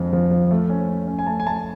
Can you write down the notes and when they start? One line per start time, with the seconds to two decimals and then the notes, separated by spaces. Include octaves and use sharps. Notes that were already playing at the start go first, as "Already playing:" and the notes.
Already playing: F2 D3 F3 G#3
0.13 F3
0.31 F3
0.51 A3
0.69 C#4
0.89 C#4
1.07 C#4
1.19 G#5
1.27 A3 A5
1.40 G#5
1.46 A3 A5